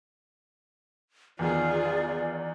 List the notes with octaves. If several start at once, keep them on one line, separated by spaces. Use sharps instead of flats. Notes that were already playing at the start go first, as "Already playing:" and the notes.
E2 D#3 F4 G#4 D5